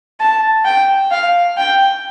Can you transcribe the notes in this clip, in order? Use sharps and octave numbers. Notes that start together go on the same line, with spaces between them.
A5
G5
F5
G5